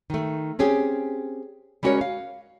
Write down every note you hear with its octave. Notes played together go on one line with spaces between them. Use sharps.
D#3 A3
C4 C#4 G4 G#4
G3 G#3 C#4 F#4 A#4 C#5
F5